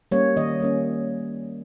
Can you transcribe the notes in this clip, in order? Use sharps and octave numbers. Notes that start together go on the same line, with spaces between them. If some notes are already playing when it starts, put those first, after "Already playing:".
G3 A#3 C#4 C#5
D#3 D#5
G3 A#3 C#4